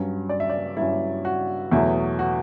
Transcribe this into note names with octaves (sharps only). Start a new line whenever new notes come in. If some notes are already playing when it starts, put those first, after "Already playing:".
Already playing: G2 F#3 C#4
D5
E5
D5
G2 F#3 C#4 E4
F#4
E2 B2 F#3 A3 E4
F#4